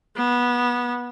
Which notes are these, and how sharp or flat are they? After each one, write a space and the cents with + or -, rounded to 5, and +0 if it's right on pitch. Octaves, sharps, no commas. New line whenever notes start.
B3 -20